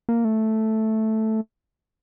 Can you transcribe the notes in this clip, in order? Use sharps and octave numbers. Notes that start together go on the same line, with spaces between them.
A#3
A3